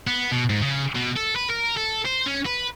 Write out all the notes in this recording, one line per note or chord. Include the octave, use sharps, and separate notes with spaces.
B3
B2
G#2
C#3
B2
A4
B4
A#4
A4
C5
C#4
B4